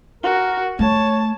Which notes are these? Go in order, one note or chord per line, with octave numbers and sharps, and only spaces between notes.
F#4 A#4
A3 C#5 A5